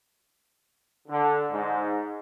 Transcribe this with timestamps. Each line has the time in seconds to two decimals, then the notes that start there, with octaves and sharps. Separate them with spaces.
1.08 D3
1.50 G#2